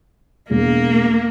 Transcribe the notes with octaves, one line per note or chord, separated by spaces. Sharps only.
E1 A#3